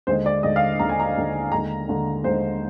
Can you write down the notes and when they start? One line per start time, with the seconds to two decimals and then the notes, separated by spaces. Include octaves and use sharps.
0.07 D#2 D3 G#3 C5
0.26 D5
0.43 D#2 D3 G#3 D#5
0.56 F5
0.80 D#2 D3 G#3 A#5
0.89 G#5
1.00 A#5
1.16 D#2 D3 G#3
1.52 D#2 D3 G#3 A#5
1.88 D#2 D3 G#3
2.24 D#2 D3 G#3 C5